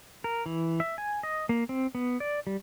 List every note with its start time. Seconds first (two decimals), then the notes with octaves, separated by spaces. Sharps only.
0.24 A#4
0.46 E3
0.80 E5
0.98 G#5
1.23 D#5
1.49 A#3
1.69 C4
1.95 B3
2.20 D5
2.47 G3